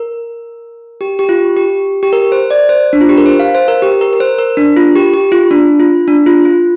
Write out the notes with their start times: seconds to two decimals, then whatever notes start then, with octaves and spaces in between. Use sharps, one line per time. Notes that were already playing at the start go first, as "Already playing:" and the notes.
Already playing: A#4
1.01 G4
1.19 G4
1.29 F4
1.56 G4
2.03 G4
2.13 A#4
2.32 C5
2.51 D5
2.69 C5
2.93 D4
3.01 F4
3.09 G4
3.18 A#4
3.26 C5
3.40 F5
3.55 C5
3.68 A#4
3.82 G4
4.01 A#4
4.13 A#4
4.20 C5
4.38 A#4
4.57 D4
4.77 F4
4.95 G4
5.13 G4
5.32 F4
5.51 D4
5.80 F4
6.08 D4
6.26 F4
6.45 F4